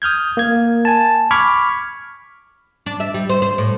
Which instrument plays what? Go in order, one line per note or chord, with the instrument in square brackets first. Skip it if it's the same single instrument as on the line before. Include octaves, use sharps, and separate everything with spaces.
[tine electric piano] D#6 F6 G6 G#6
A#3 G#6
G#5 A5
B5 C#6 D6 F6 G#6 B6
[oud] D4
E5
G3
C5
C5
A2